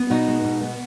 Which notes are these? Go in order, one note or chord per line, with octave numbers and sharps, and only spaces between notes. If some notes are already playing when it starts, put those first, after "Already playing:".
Already playing: B3
B2 D#4 F#4
G#3
B2
B3